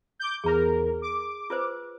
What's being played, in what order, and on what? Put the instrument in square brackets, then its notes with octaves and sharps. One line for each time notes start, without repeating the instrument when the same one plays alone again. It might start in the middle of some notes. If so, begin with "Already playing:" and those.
[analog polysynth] D6 G6
[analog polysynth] E2 A#4 [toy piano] G#4 A#5
[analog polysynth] D6
[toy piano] F4 B4 C5